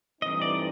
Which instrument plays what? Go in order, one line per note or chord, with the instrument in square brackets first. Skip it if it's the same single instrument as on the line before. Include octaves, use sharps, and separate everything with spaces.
[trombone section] G2 E3 A3 C4 D#4 [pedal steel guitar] D#5
[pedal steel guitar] D5